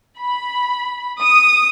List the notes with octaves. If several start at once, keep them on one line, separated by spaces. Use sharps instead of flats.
B5
D#6